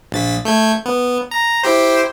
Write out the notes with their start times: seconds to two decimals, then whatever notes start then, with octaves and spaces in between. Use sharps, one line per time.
0.12 A#1 A6 B6
0.45 A3 G6 G#6
0.85 B3
1.31 A#5
1.63 E4 G4 C5